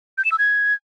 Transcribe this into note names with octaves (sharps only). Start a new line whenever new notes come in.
G6
E7
E6
G#6